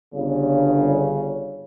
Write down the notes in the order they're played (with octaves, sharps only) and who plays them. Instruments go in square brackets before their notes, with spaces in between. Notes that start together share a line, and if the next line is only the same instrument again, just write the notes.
[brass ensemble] G1 C#3